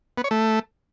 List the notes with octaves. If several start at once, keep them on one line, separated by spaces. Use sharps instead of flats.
B3
C#5
A3